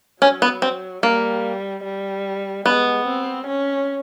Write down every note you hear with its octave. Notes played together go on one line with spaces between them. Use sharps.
F#3 C#4
B3
C4
G3 A#3
G3
G#3 B3
C4
C#4